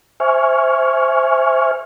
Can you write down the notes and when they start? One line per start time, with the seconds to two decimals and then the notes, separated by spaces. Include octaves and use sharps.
0.20 C5 E5 G#5 C#6 F6